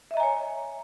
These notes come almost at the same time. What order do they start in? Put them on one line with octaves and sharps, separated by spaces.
E5 D#5 A#5 G#5 C#5